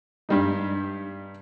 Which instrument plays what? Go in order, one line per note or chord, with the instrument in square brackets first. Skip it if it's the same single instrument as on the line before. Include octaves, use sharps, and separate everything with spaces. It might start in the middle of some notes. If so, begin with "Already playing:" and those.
[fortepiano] G2 G3 D#4